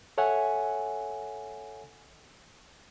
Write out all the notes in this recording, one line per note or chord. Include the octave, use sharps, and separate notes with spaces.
A4 C#5 E5 F#5 G#5